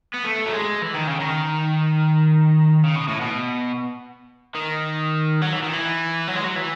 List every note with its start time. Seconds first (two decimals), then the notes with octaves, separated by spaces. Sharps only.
0.14 B3
0.24 A3
0.46 F#3
0.53 G#3
0.82 E3
0.95 D#3
1.07 C#3
1.20 D#3
2.84 C#3
2.96 B2
3.08 A2
3.21 B2
4.55 D#3
5.41 F#3
5.52 E3
5.62 D#3
5.73 E3
6.28 F#3
6.36 G#3
6.44 F#3
6.56 E3